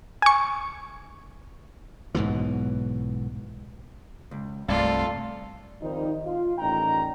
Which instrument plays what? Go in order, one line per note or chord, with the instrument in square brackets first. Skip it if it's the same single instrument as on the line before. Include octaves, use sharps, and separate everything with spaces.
[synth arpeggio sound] G#5 C#6
[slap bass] B1 G#2 B2 E3
[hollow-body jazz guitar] C#2
[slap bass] C2 G2 [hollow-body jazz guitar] A3 D5 F5 [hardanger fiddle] F4 A4
[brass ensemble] D#3 F3 G3 A#3 C4 D#4
F4
A1 D#2 G3 D#4 G5 A#5